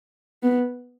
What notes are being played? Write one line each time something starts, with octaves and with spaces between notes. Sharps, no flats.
B3